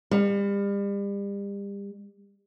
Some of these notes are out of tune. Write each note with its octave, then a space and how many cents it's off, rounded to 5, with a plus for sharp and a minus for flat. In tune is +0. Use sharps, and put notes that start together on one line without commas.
G3 +35